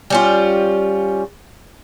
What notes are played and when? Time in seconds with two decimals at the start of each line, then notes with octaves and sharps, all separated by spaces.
0.10 G3 C#4 F4